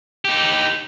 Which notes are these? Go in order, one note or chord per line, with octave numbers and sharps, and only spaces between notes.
D#4 G4